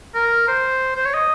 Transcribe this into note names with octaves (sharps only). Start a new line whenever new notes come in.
A#4
C5
C5
C#5
D#5